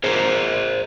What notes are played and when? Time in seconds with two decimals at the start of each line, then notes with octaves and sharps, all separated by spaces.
0.04 G#4 A#4 C5